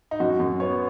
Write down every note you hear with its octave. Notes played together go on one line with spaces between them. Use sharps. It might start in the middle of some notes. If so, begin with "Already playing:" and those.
D#4
F#2 F#4
F#2
B3 C#5